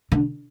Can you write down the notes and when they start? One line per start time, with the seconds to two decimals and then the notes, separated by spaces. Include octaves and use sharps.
0.12 D3